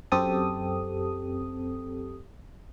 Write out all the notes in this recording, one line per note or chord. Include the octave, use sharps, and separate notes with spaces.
F#2 C4 G4 A4 D#6